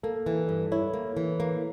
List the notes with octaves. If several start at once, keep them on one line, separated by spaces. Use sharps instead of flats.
A#3 A4
E3
G2
E4 C#5
A#3
E3
A#3